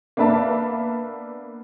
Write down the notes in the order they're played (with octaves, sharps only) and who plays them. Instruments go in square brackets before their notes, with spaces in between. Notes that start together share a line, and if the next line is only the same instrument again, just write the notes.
[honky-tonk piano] A#3 B3 D4 B4 E5 A5